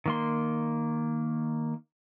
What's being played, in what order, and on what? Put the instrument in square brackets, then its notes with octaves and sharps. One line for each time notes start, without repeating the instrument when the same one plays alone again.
[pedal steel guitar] D#3 A#3 C6